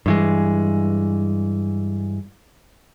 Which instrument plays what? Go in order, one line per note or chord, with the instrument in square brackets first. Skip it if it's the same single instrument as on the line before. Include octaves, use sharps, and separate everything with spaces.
[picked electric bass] G2 E3 G#3